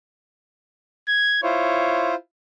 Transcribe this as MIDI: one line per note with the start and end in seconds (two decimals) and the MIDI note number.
1.08 1.39 92
1.43 2.15 64
1.43 2.15 65
1.43 2.15 72
1.43 2.13 73